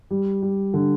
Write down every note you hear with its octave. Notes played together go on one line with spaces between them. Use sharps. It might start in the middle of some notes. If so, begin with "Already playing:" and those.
G3
G3
D3